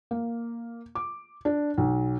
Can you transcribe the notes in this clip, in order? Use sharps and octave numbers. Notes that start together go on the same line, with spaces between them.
A#3
D6
D4
B1